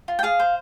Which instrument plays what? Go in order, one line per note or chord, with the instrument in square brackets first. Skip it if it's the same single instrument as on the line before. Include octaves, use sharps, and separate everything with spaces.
[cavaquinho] F4
G5
G#4 F5
C5